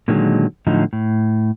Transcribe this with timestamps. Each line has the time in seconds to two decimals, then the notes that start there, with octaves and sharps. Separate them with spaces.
0.08 A#2 D3 D#3 F#3 G#3
0.67 A2 D3 F3 F#3 D#4
0.93 A2